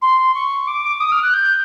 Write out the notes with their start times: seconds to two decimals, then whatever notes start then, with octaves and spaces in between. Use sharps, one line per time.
0.02 C6
0.35 C#6
0.67 D6
1.00 D#6
1.12 F6
1.23 F#6
1.33 G6